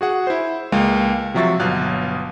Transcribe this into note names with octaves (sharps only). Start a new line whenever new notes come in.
F#4 G#4 F#5
E4 C5
C#2 G#3 A#3 F5
C3 F3 F#3 E5 C#6 A6
G1 B2 F#3 F5 F#6